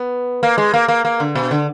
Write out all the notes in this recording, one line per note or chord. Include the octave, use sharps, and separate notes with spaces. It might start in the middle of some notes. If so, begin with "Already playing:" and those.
Already playing: B3
A#3
G#3
A#3
A#3
A#3
D3
B2
D3